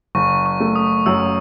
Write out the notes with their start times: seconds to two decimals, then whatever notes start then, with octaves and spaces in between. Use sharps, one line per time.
0.15 F#1 C#6
0.46 C#6
0.60 A3
0.76 D#6
1.06 F#2 E6